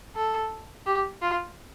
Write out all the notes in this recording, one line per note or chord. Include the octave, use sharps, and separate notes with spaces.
A4
G4
F4